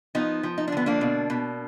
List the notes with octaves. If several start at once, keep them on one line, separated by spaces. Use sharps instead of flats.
F3 B3 D#4
F3
D#4
D4
D3 B3
A#3 D4
B2
B2